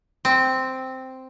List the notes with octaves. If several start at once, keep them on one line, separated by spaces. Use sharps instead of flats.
C4